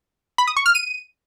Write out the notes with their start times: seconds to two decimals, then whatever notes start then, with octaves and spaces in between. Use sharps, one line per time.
0.38 B5
0.47 D#6
0.57 C#6
0.66 F6
0.75 D#7